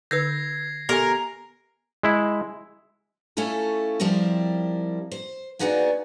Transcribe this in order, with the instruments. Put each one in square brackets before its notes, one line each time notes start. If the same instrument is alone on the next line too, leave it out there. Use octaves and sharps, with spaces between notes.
[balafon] D3 D#4 [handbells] B4 E6 G6 [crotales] G#6 A#6 C7
[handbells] B3 G#5 [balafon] G4 A4 [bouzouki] A#4
[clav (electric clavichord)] G#3 E4
[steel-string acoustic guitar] A3 C#4 E4 F4 A4
F3 G3 C4 E4 A#4
C5
A#3 B3 D#4 F#4 G#4 D5